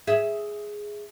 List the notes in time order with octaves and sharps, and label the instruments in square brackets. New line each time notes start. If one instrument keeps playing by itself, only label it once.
[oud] G#4 E5